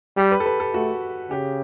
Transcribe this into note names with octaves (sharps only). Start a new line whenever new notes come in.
G3 G4
B4
A4
B4
A4
A3 F#4
C#3 G4